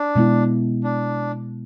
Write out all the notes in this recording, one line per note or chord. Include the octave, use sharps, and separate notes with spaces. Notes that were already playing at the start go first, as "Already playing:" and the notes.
Already playing: D4
B2 G#3 B3 E4
D4